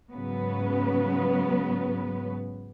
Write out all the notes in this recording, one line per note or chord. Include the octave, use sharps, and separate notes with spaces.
G#2 C#3 F#3 B3 C#4 B4